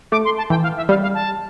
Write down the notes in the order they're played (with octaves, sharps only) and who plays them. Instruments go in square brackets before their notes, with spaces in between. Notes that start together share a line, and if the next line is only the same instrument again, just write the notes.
[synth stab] A3 [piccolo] D6
[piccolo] C6
A5
[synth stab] E3 [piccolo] G5
[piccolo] F5
E5
[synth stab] G3 [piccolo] F5
[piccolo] F5
A5